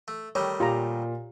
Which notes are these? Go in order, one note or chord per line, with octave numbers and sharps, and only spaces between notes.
A3
D#3 G3 A3 C#5
A#2 F4 G4 A#5